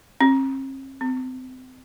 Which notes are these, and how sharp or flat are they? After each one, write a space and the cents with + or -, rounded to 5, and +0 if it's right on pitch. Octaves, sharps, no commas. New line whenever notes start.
C4 +45
C4 -30